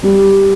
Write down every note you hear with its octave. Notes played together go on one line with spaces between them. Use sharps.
G3